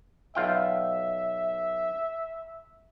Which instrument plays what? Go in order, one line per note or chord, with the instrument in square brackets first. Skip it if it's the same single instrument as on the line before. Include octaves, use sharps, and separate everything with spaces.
[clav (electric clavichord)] B1 F4 G5 [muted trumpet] E5